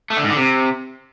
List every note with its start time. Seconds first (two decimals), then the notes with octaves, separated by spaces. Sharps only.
0.10 A3
0.17 D3
0.23 G#2
0.30 D3
0.37 C3